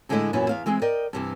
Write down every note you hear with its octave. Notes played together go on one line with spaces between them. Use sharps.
A2 D3 G#3 A3 E4 D#5
F#2 A#2 E3 B3 C#4 E4
E2 E4 F5
E3 G#3 C4 G#4
A#4 D5 D#5 G5
G2 C3 E3